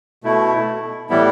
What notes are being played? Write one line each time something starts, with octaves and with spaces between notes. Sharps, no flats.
B2 A3 E4
A2 E3 G3 B3 E4